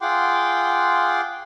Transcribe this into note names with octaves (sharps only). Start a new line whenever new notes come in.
F4 G#4 F#5 G5 C6 D6